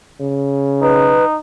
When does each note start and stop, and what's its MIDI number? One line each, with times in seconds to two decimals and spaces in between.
0.20 1.20 49
0.82 1.38 63
0.82 1.25 71